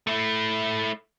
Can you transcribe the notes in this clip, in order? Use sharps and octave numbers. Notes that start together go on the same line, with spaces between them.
A3 E4